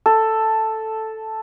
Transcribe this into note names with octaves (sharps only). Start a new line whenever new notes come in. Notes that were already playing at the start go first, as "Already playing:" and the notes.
A4